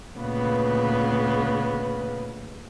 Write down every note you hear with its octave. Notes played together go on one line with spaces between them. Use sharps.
D2 A#2 C#3 B3 B4